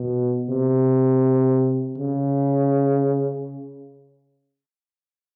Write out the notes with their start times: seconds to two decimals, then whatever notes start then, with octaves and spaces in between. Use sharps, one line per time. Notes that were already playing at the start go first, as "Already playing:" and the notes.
Already playing: B2
0.50 C3
1.98 C#3